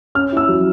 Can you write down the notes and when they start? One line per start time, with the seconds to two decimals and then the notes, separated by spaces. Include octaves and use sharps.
0.15 C#4 F6
0.32 E4 E6
0.48 F#3